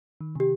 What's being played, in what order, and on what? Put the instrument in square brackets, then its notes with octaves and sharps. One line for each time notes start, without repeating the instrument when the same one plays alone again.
[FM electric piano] D#3
[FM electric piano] C3 [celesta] G4